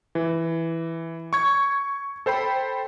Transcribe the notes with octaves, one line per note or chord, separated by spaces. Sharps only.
E3
C#6 G#6
A4 C5 G5 B5